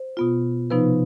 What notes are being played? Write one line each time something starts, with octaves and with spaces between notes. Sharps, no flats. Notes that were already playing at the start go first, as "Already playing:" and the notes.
Already playing: C5
B2 B3 F4
C3 F3 B3 D#4 B4